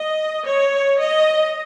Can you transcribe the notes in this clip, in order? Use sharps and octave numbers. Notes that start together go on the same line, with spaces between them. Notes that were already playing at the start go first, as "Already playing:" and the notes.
Already playing: D#5
C#5
D#5